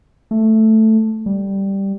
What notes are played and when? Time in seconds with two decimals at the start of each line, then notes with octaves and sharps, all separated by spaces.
0.31 A3
1.26 G3